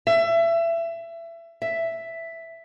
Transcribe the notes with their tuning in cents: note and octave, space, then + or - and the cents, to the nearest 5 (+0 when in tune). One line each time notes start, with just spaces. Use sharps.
E5 +25
E5 +5